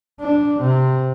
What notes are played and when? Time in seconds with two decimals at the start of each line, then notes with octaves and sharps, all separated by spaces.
0.21 D4
0.59 C3